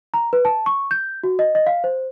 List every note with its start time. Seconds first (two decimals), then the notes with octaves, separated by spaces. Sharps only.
0.14 A#5
0.33 B4
0.45 A5
0.66 C#6
0.91 G6
1.24 F#4
1.39 D#5
1.55 D#5
1.66 F5
1.84 C5